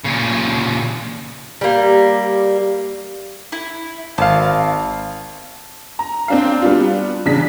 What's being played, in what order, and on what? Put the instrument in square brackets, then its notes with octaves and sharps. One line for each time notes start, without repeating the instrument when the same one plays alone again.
[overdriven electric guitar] A#2 C#3
[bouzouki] G3 A#3
[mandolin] E4
[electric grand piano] G#1 F5 [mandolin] A5
[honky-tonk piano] A#5
C4 D4 F5
G3 B3 D4 F4
E2 C#3 D4 B6